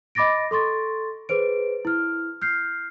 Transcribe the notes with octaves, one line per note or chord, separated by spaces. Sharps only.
D#5 B5 D6 A6 A#6 D7
A4 C6 C#6 A6
G#4 B4 C5 D7
E4 F6
F6 G6 C7